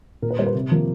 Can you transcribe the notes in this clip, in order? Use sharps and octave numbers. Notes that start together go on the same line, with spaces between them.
A#2 A#4
B4
G3 A#3 C5
B4
C3
F3 A#3